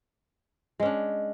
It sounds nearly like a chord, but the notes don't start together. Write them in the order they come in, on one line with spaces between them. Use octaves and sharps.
G#3 C#4 D4